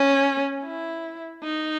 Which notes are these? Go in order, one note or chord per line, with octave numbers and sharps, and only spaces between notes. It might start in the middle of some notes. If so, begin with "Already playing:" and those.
Already playing: C#4
E4
D#4